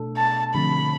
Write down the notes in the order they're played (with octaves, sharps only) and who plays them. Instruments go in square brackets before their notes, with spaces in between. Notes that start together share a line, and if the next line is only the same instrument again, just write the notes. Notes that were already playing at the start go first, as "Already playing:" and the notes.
Already playing: [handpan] B2 A3 D4 A4
[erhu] A5
[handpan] D3 F3 A3 C4 [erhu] B5